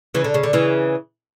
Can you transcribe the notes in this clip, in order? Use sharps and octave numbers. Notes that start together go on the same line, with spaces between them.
C#3 E3
D3
C#3
D3
C#3 E3